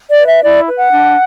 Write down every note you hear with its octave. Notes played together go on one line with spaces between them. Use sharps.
D5
B4
E5
E4 D5
B4
F#5
D4